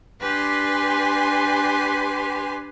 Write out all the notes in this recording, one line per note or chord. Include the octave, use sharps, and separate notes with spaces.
D4 G4 B4 G#5 C6